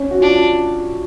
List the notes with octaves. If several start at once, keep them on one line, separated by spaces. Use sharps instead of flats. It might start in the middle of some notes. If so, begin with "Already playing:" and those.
Already playing: C#4
F#4
D4 F4